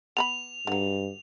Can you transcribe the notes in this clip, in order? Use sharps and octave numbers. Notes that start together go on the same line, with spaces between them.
B3 B4 B5 F7
G2 D3 F#3